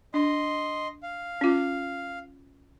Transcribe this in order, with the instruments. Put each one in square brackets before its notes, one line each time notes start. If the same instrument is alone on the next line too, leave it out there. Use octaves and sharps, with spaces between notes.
[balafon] D4 [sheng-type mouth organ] D#5 C6
[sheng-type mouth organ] F5
[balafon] C#4 F4